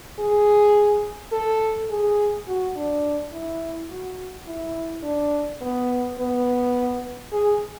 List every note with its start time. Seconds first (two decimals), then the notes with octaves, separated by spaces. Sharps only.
0.19 G#4
1.32 A4
1.91 G#4
2.48 F#4
2.76 D4
3.33 E4
3.90 F#4
4.47 E4
5.03 D4
5.61 B3
6.18 B3
7.32 G#4